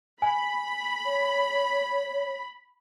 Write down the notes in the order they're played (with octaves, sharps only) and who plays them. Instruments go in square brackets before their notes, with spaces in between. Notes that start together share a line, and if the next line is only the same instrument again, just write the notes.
[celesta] G#5 [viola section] B5
[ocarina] C#5